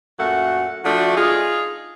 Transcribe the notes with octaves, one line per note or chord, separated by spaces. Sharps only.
F#2 A#2 A3 F#4 F#5
F3 A3 D4 F#4
D#4 F4 G#4